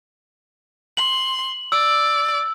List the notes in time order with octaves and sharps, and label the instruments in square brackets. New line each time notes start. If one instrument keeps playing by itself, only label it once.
[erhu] C6 [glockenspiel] F#7
[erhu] D5 [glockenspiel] E6